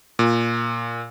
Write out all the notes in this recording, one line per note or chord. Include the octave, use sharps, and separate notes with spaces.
A#2